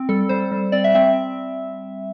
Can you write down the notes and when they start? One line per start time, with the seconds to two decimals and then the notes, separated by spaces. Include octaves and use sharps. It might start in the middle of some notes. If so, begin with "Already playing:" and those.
Already playing: C4
0.09 G3 A4
0.29 G3 C5
0.52 G3
0.72 C4 D5
0.84 E5
0.95 C4 E5